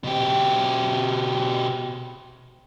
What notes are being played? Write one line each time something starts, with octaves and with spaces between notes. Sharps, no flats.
B2 G4